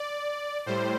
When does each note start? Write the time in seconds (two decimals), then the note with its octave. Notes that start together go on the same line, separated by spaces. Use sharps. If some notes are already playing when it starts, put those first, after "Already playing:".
Already playing: D5
0.66 A2 G3 C5